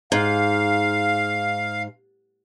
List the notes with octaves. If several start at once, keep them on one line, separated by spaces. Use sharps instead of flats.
G#2 F5